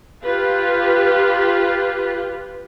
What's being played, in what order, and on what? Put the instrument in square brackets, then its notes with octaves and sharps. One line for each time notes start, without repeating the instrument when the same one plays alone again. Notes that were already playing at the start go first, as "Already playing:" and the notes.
[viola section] F4 G4 B4